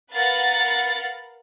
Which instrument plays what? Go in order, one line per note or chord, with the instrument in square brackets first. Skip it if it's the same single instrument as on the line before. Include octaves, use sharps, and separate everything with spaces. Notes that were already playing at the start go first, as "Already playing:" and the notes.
[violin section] A#4 B4 F5 F#5 A6